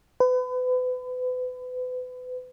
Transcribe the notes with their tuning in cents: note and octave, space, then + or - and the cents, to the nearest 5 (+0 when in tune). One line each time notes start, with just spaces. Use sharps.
B4 +35